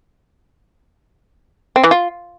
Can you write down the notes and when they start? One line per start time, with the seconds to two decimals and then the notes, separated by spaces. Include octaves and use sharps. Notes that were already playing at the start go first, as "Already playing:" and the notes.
1.76 C4
1.83 E3
1.91 F4